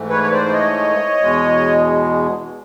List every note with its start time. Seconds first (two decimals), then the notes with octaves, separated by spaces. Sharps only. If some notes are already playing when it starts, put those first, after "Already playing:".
Already playing: G#2 E3 A3
0.09 B4 C#5
0.24 C#5
0.32 C5 D5
0.48 D5
0.53 C#5 D#5
1.21 E2 B2 G#3